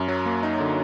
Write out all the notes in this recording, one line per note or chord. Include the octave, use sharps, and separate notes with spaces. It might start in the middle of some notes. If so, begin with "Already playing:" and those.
Already playing: F#2
F#3
A#3
D#4
D3